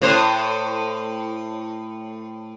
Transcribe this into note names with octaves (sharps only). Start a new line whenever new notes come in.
A2 C5